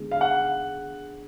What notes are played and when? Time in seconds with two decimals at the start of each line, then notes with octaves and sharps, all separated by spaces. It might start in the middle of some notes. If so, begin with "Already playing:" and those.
Already playing: D3 G#3 B3
0.11 F5
0.21 F#5